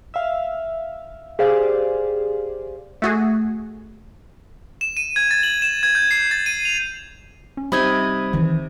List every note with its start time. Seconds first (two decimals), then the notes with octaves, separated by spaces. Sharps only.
0.14 E5 F5
1.39 G4 G#4 C5 D5 F5
3.02 A3 F#4 G#4
4.81 E7
4.97 D#7
5.16 G#6
5.31 A6
5.43 F#7
5.62 E7
5.83 G#6
5.95 G6
6.11 C7
6.31 A6
6.46 D#7
6.65 F7
7.57 C#4
7.72 C3 G3 D#4 E5 B5 D#6 G#6
8.33 D#3 E3